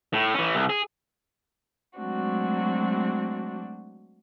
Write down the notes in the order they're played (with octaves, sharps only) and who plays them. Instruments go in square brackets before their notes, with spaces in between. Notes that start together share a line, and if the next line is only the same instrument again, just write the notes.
[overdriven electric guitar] A2
E3 C#4
C2
G#4
[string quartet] F#3 G#3 A3 C4 D4 F#4